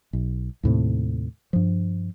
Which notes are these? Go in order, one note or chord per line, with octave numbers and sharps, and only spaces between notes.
B1
D#2 A2 C3
G2 F3